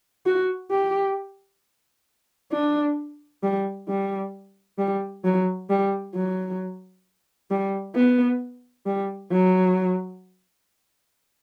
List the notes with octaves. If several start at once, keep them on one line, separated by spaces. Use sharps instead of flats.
F#4
G4
D4
G3
G3
G3
F#3
G3
F#3
G3
B3
G3
F#3